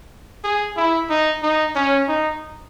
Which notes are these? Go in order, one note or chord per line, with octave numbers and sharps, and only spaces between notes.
G#4
E4
D#4
D#4
C#4
D#4